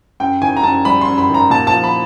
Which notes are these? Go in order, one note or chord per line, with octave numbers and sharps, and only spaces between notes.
F#2 G5
D#3 G#5
A#5
F#2 A5
G3 B5
C6
F#2
B5
D#3
A#5
A#2 A5
A5
F3
B5